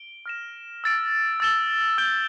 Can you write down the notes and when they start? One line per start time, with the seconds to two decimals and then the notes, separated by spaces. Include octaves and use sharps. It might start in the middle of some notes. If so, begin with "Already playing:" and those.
Already playing: D7 G7
0.26 F6 A#6 E7
0.84 E6 A6 D7
1.40 E6 A6 E7 G7
1.98 E6 G6 D7 G7